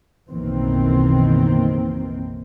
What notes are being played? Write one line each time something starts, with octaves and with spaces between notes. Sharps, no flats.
F#1 B1 D#3 E3 A#3 C4